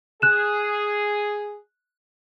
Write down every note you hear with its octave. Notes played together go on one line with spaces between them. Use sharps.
G#4 F#6 E7